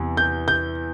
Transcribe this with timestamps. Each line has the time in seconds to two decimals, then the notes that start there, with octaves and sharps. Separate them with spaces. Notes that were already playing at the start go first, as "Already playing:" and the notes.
Already playing: E2 C3 E3
0.17 G6
0.48 G6